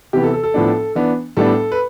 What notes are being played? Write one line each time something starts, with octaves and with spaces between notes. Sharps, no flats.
C3 E3 B3 G4
A4
A4
A4
A2 F3 B3 D4
E3 B3 D4
A2 G3 B3 D4 A4
B4